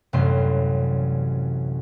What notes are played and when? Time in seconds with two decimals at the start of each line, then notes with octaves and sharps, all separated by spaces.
0.13 A1 F#2 C3 G3 A3 C6